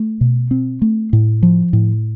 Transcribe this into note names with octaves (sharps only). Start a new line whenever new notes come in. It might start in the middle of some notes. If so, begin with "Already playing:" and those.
Already playing: A3
B2
C4
A3
A2
F3
A2